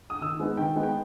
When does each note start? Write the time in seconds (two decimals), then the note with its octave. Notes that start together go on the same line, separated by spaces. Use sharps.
0.10 D#6
0.21 D#3 E6
0.40 G#3 B3 D#4
0.57 D#3 G5
0.76 G#3 B3 D#4
0.83 G5